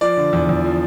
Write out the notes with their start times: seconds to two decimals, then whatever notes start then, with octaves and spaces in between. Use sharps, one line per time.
0.01 F3 D5
0.17 D3
0.33 E2
0.49 E2
0.64 F3